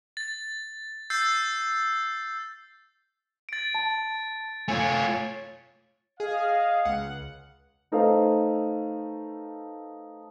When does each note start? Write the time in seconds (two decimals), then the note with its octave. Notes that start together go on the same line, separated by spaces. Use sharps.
0.17 A6
1.10 E6 G6 A6 C7
3.49 A6 D7
3.75 A5
4.68 A3 F4 C#5 G#5
6.20 G#4 D#5 F5
6.85 C#2 F#5
7.92 A3 D#4 A4 B4 C5 F5